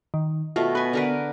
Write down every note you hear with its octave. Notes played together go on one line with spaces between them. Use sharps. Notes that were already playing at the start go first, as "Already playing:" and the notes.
D#3
B2 A3 F4
B3 B4 G#5
D3 A#4 B4